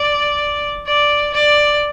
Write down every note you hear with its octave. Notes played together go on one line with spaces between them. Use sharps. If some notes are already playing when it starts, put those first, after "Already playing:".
Already playing: D5
D5
D5